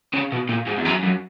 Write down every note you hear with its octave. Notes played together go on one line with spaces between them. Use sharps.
C#3
B2
A#2
G#2
E2
F#2
F#2